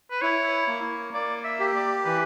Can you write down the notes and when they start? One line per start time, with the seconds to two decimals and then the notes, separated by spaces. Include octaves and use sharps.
0.11 B4
0.21 E4 C#5
0.67 A#3
1.14 A#3 D5
1.44 E5
1.59 G4
1.75 D5
2.05 E3 B4